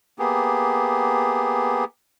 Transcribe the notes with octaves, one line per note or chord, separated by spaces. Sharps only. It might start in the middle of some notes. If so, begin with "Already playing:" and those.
A#3 B3 G4 G#4